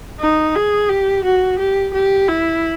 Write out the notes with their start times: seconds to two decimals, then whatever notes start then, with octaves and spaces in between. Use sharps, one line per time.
0.20 D#4
0.55 G#4
0.90 G4
1.24 F#4
1.59 G4
1.94 G4
2.29 E4